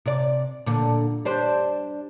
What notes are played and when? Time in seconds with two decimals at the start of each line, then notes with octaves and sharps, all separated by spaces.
0.06 C3 D5
0.66 A#2 D3
1.25 G3 D4 C5